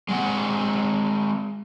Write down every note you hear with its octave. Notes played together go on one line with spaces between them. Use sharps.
G#3 C4 F#5